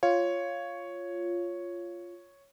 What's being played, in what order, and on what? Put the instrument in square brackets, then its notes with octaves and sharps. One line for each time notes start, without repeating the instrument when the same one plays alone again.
[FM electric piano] F4 [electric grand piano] C#5